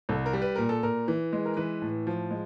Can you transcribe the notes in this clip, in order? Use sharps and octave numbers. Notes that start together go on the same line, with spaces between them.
C2 A4
A#4
G3
B4
A#2 A#4
A4
A#2 A#4
E3
G#3
A#4
E3 B4
A2
F3
G#3